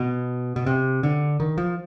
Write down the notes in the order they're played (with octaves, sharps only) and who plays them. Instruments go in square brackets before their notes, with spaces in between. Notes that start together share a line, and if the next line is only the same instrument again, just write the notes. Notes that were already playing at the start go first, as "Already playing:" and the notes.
Already playing: [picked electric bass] B2
B2
C3
D3
D#3
F3